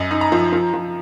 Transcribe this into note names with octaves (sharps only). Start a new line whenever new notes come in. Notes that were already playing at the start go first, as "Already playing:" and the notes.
Already playing: F#2 D#5
D#4
A#5
F3
F3
F3